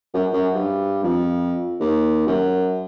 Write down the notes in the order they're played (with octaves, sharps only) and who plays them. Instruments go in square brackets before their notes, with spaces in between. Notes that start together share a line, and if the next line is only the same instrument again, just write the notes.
[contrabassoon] F#2
F#2
G2
F2
D#2
F#2